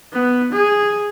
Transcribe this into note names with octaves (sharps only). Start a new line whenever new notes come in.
B3
G#4